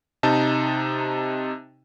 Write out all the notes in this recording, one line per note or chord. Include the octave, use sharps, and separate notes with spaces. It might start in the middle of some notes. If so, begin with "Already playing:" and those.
C3 D#4 A5